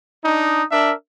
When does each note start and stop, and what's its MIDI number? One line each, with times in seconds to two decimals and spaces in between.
0.24 0.63 62
0.24 0.63 63
0.71 0.93 62
0.71 0.93 70
0.71 0.93 76